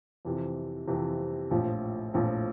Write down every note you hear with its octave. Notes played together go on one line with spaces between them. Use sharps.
F2 C3 E3
F2 C3 E3
A#1 A2 F3
A#1 A2 F3